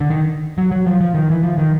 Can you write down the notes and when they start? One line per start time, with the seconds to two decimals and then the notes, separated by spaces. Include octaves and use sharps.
0.01 D3
0.11 D#3
0.58 F#3
0.72 F#3
0.87 F3
1.01 F3
1.15 D#3
1.30 E3
1.43 F3
1.58 D#3